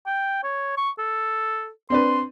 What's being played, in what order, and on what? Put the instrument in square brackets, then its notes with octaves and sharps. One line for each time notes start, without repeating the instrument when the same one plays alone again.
[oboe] G5
C#5
C#6
A4
[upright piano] C4 D4 B4 [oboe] C6